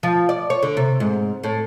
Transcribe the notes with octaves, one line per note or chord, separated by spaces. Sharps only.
F3
D5
C#5
D3
C3
G#2
A2